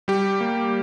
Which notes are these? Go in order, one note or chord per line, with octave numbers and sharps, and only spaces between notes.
G3 G4
A#3